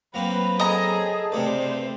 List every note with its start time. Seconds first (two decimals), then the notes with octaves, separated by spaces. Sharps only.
0.14 F#3 A#3 C4 B4
0.60 G#4 A4 D#5 A#5
1.32 G2 C3 A3 C5 D5